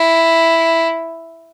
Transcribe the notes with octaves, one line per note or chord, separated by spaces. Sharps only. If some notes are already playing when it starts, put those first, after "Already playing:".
Already playing: E4